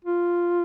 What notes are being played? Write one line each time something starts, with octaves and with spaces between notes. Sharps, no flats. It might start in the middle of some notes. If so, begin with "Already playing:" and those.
F4